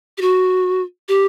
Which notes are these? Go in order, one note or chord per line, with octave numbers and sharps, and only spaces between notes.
G4
F#4
G4